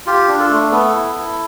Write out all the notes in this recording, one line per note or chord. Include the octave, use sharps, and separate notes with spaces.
F4 G4
D4
A4
A3
B3 A4
E4
E4